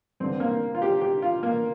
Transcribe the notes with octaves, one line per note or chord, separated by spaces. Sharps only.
G2 D3 C4
A#3
F4
G4
G4
F4
A#3